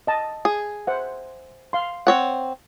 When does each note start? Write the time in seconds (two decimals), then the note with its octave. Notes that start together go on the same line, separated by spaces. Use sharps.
0.07 D#5 A5
0.45 G#4
0.87 C5 E5 F#5
1.73 F5 C6
2.07 C4 C#5 F#5